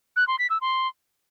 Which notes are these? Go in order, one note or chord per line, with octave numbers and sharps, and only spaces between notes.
F#6
C6
B6
E6
C6